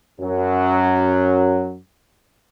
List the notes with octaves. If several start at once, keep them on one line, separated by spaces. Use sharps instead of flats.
F#2 F#3